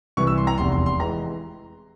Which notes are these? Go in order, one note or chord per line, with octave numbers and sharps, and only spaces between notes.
C2 C3 E3 G3 C#6
E6
C6
A#5
F1 E2 C3 C6
C6
C6
E3 G#3 A#5